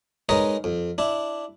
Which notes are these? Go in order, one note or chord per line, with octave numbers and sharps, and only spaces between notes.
G#3 D#4 A#4 B4 C#5 D#5
F2
D4 E4